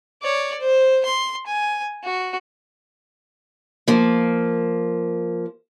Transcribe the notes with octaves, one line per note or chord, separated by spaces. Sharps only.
C#5 D5
C5
C6
G#5
F#4
F3 A#3